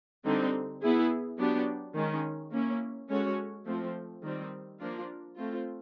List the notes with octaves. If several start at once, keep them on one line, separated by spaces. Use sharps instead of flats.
D3 G3 C4 D#4
B3 E4 G#4
F#3 B3 D4 G4
D#3 G#3 C#4
A#3 C#4 E4
G#3 C#4 F#4 A4 C#5
F3 A3 C4
D#3 G3 C4
F3 A#3 D4 F4 A#4
A3 C4 F4